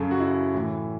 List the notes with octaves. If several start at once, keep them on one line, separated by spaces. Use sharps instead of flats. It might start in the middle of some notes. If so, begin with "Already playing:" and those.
Already playing: F#2 C#3 F#3 A4
F#4
E4
A2 E3